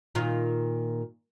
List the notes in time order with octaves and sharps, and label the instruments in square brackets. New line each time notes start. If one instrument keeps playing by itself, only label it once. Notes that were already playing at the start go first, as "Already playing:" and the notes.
[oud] A#2 D#3 F4